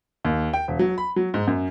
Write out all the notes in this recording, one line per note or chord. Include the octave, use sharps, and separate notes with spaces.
D#2
G5
E1
F#3
B5
F#3
G#2
F#2